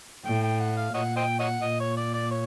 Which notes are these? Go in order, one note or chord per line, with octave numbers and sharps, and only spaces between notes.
A2 G5
G5
F#5
F5
A#2 C#5 D#5 F#5
C5 D#5 G5
C#5 D#5 F#5
A#2 D#5
C#5
D5
D5
C#5